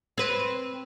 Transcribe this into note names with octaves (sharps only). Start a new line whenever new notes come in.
C4 B4